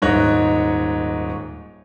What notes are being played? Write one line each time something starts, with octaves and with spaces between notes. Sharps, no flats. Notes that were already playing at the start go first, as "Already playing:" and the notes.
D#1 G#2 D#4 C#5 D#5 F#6